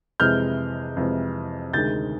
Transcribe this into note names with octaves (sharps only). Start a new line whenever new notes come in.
F2 C3 E3 G#3 F6 G6
F2 C3 E3 G#3
D2 C3 D#3 G#3 G6 A6